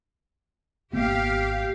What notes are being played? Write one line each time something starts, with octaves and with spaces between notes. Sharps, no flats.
G#1 A#3 B3 G4 F5